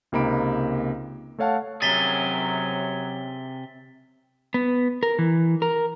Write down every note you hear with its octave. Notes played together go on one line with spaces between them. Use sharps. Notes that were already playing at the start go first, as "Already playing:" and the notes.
C#2 C3 A#3 D#4 B5 D7
A3 A4 C#5 F5 F#5 A5
F#2 C3 F#3 G#4 A6 B6 G7
B3
A#4
E3
A#4